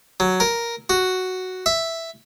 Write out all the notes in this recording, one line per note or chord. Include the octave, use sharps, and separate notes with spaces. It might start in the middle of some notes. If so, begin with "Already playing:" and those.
F#3
A#4
F#4
E5